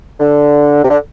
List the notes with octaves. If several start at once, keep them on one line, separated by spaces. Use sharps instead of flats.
D3
C3
D3